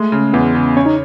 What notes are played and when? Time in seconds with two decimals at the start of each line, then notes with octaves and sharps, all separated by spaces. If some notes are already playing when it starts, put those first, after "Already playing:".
Already playing: G#3 A3
0.12 C#3
0.33 E2 B3
0.55 C#3
0.77 C#4 C#5
0.86 D#4